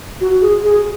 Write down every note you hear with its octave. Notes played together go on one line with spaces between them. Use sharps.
F#4
G#4
G#4